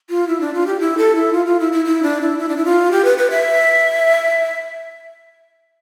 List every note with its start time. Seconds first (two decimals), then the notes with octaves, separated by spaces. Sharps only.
0.10 F4
0.28 E4
0.41 D4
0.54 F4
0.66 G4
0.80 E4
0.98 A4
1.15 E4
1.33 F4
1.46 F4
1.60 E4
1.72 E4
1.85 E4
2.03 D4
2.21 E4
2.39 E4
2.49 D4
2.57 E4
2.65 F4
2.92 G4
3.05 B4
3.18 B4
3.30 E5